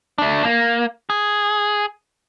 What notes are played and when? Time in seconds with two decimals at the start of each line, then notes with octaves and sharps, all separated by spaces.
0.18 A3 D4
0.45 A#3
1.10 G#4